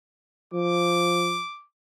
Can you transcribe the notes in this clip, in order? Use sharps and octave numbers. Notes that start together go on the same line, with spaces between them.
F3 D6